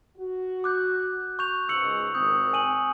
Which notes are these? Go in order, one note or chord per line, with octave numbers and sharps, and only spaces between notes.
F#4
D6 F#6 G6
C#6 G6 F7
C#2 G#2 E6 C#7 F#7
G#1 C4 D#6 G6
G#5 D#7 F#7